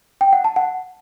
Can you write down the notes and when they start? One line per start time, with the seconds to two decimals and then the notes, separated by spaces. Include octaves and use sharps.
0.21 G5
0.33 F#5
0.44 A5
0.56 F#5